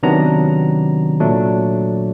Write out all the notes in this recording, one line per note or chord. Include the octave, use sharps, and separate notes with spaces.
C3 D#3 F#3 B3 D4 A#5
A#2 F#3 A3 D4